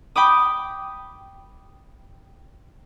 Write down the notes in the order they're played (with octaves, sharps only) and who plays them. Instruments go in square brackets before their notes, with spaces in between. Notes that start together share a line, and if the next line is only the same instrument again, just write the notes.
[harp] G5 B5 D6 D#6